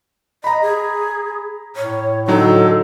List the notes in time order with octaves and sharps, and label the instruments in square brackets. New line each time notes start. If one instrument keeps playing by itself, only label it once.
[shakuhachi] D#5 [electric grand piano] A#5 B5
[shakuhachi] G#4
[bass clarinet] A2 [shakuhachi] C#5
[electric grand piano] D3 F#3 D#4 [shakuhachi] A4